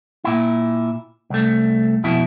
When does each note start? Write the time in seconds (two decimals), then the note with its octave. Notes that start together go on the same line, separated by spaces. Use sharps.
0.24 A#2 E4
1.30 C2 A3
2.04 F2 B2 E4